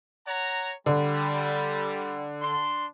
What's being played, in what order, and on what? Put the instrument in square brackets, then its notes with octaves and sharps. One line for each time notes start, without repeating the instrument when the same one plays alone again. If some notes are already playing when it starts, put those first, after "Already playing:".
[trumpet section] C#5 F#5 A#5
[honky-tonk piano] D3 [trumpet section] G3
[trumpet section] D4 C6